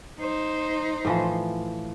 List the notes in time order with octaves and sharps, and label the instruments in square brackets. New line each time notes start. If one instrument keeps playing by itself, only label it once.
[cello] D#4 C5
[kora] A2 E3 F3